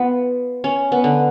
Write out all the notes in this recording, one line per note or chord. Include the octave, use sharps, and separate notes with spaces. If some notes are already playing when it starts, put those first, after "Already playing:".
Already playing: B3 F4
C#4
B3
D3